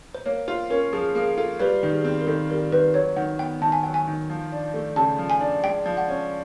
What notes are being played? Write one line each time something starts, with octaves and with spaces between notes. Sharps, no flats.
C5
A#3 C#5
F4 C5
C#4 A#4
F3 G#4
A#3 G#4
F4 A4
G3 B4
D#3
G#4
C4
A#4
D#3 A4
G3 A#4
D#3 B4
F#3 C#5
D#3 F#5
B3 G5
D#3 A5
G#5
F#3 G5
G#5
D#3
F3
D4
A3
C#3 A5
F3
G#5
D4
G#3 G5
F3
F#5
C#4